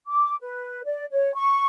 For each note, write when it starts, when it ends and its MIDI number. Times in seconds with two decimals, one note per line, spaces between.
0.07 0.35 86
0.41 0.82 71
0.85 1.04 74
1.11 1.33 73
1.34 1.67 85